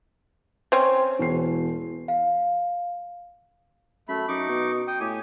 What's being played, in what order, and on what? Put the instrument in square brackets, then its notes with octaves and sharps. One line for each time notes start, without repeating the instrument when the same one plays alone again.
[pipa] C4 C#4
[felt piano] E1 C7
[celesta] F5
[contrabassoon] F#2 [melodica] A3 B5
[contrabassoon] F#2 [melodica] D#4 C#6 D6
[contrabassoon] B2
[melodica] G5 D#6
[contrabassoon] A2 [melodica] G4 G#5